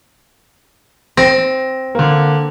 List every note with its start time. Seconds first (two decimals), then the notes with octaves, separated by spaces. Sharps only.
1.17 C4 A#6
1.95 D3 A#3